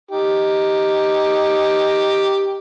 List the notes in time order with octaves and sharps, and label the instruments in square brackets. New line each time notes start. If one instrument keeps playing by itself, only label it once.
[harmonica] D#4 G4